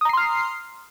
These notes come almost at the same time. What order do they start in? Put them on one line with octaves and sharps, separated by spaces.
D#6 A#5 C7 C6 F6